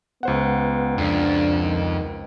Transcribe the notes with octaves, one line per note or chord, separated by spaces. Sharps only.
C#2 B3 C5 F#5
F2 D4
D#3